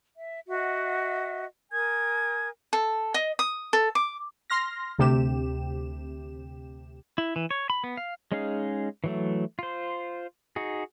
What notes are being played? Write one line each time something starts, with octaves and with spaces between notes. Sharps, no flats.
E5
F#4 D#5 E5 F#5
A#4 G#5 D#6 G#6
A4
D#5
D#6
A4
D6
C6 F6 A#6
D2 C3 G4 E7
E4
E3
C#5
B5
B3
F5
G#3 C#4 D#4 G#4 F5
E3 F#3 A3
F4 C5
D#4 F#4 G#4